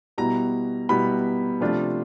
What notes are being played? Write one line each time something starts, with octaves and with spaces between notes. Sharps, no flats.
B2 G3 B3 E4 A#5
B2 G3 B3 E4 B5
C3 F3 A3 D4 F4